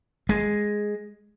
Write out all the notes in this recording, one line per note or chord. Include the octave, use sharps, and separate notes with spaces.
G#3